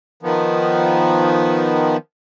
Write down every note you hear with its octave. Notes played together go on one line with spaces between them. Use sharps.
D#3 F3 B3